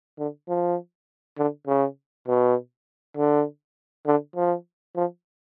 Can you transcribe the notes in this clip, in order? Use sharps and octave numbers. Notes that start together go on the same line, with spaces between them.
D3
F3
D3
C#3
B2
D3
D3
F3
F3